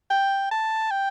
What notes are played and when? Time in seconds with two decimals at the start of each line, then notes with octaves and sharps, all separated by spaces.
0.10 G5
0.51 A5
0.91 G5